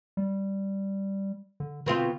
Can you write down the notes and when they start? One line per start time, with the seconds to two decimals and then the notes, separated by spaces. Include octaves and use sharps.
0.17 G3
1.60 D3
1.86 B2 D3 C4 F4